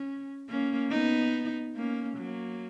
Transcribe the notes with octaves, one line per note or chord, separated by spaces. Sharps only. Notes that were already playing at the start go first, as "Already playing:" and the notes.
Already playing: C#4
A#3 C#4
B3 D#4
A#3 C#4
F#3 A#3